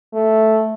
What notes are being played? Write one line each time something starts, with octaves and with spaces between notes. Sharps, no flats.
A3